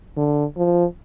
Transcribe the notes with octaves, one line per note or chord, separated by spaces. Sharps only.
D3
F3